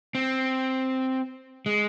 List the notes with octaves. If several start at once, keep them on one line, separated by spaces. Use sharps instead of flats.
C4
G#3